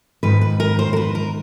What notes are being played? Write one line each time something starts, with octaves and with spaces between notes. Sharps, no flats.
G#2 D#3 B4
B4
A#4
C5
A#4
B4
A#4